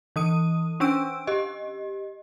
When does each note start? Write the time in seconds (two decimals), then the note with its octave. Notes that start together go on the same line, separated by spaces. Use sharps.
0.16 E3 D#6 D#7
0.80 C#4 D4 E6 D7
1.27 G4 D#5